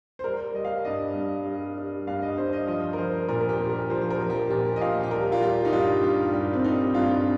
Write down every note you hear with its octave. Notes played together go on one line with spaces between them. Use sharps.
C5
G3 A#4
G3 D#5
F5
G2 D#5
G2
G3
G3
G2 F5
D#5
G2 C5
D#5
F3 D#5
A#4
F3 C5
A#2 A#4
A#4
G4
A#2 G4
A#4
F3 C5
C5
A#4
F3
G4
A#2 G4
D#5
A#2 F5
G4
G3 A#4
F4
G3 G4
D#4
G2 F4
G2 G4
G3 G4
C4
G3 D#4
G2 F4
F4